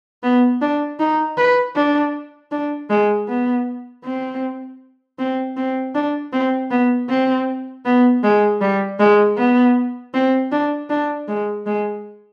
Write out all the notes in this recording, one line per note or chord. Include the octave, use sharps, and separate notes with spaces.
B3
D4
D#4
B4
D4
D4
G#3
B3
C4
C4
C4
D4
C4
B3
C4
B3
G#3
G3
G#3
B3
C4
D4
D4
G#3
G#3